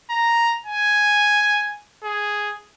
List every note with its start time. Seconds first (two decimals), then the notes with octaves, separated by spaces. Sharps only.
0.10 A#5
0.66 G#5
2.04 G#4